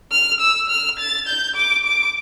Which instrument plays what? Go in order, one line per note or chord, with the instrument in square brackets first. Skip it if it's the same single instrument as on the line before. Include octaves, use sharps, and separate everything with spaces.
[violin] F6
E6
F6
A6
G6
D6
D6